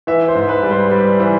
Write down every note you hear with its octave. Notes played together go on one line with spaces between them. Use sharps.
E3 E5
C5
G#2
B4
G3
C5
G3
E3